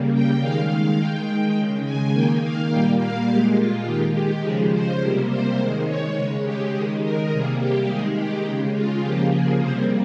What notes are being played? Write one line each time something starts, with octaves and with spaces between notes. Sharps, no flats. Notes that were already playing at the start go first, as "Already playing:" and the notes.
Already playing: C#3 G3 A#3
G5
D#3 G#3 F5
D#3 G#3 G5
C#3 G#3
G#5
D#3 A#3 G5
F5
A#2 G3 A#3 G5
F5
A#2 G#3 G4
F4
D#3 G#3 G4
G4
C#3 F3 G#3 G#4
C5
C3 G3 A#3
C5
D#3 G#3
C#5
C#3 G#3
G4
D#3 G#3 G#4
A#4
C3 G3 A#3 G#4
G4
D#3 G#3 G#4
G4
C#3 G#3
F4
C#3 F3 A#3 G4
G#4
C3 G3 A#3 C5